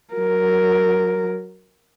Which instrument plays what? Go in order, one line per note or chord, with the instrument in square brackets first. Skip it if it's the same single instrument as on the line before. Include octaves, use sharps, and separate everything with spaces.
[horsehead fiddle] F#3 A#4